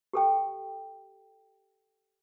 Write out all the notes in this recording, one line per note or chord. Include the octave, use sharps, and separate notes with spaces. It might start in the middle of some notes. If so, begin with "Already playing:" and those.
G4 A4 G5